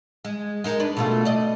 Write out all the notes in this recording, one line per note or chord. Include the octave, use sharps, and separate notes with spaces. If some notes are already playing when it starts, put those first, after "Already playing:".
G#3
G#3 D#4 A#4
D4 B4
B2 A3 F4
D5 D#5